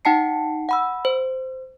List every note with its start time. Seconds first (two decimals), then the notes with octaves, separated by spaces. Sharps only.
0.05 D#4 F#5 G5 A5 C7 C#7
0.69 F#5 B5 E6
1.05 C5